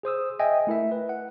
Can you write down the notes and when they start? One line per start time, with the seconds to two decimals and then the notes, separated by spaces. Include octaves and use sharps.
0.03 G#4 C5 D#6 E6
0.39 D#5 E5 G5 G#5
0.67 A3 E4 A#4 E5
0.92 B4
1.09 F#5